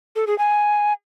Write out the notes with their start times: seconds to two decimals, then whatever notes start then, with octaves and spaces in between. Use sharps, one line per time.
0.16 A4
0.27 G#4
0.38 G#5